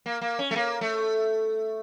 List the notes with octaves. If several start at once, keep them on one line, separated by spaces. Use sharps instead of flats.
A#3
A#3
C#4
A3
A#3
A3